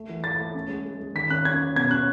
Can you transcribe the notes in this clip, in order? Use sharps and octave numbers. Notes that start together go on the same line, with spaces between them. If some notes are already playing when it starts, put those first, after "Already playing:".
Already playing: A3
E3
A3 A6
A3
C#4
G#3
G#3
G#3
D#3 B6
C#4 F#6
C#4 G#6
C#4
B2 G#6
C#4 F#6